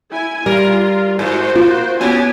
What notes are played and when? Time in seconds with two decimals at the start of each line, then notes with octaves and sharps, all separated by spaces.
0.12 E4 G#5
0.46 G3 F4 A#4
1.19 G#2 F#4 C5
1.55 A#3 F4
2.01 B3 C#4 E4 G4 G#5